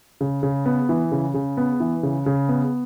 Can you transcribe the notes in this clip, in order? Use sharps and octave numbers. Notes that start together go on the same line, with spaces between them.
C#3
C#3
B3
E3
C#3
C#3
B3
E3
C#3
C#3
B3